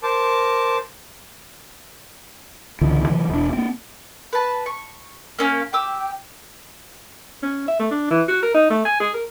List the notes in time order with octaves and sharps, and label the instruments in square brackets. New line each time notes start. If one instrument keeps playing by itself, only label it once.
[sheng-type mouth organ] A#4 C5 A5 D6
[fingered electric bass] C#2 A#2 D3 E3
C3 E3 F#3
E1 D4
A#3 C4
[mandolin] B4 A5
C#6
A#3 C#4 F5
[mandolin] G4 D6 E6 [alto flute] G5
[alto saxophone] C#4
E5
A3
D4
E3
F#4
A#4
D#4
A3
G#5
G#4
A#4